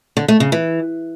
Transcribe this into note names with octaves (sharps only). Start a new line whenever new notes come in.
D3
A3
C#3
E3